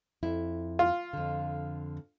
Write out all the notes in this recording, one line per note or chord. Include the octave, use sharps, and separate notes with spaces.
F2 E4 E5
F4
F2 D3